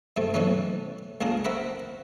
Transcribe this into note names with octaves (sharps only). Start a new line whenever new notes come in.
G2 C3 A3
B2 E3 F#3 A3 C#4 D#4
C#2 A#3 D4 G#4 A#4
C4 A#4 E5 F#5 B5 C#6